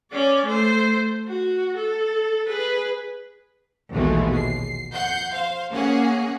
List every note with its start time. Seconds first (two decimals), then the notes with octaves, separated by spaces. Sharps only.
0.12 C#4 D5
0.46 A3 C5
1.27 F#4
1.77 A4
2.48 G#4 B4
3.92 A#1 D#2 B2 E3 G#3 A3
4.35 C7
4.92 F2 F#5 G6 C7
5.32 C5 F5
5.72 A#3 C#4 G#4 F#5